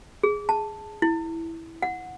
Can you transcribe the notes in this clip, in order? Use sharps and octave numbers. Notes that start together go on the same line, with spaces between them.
G#4
A5
E4
F#5